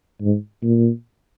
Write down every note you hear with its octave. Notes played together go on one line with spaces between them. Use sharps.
G#2
A#2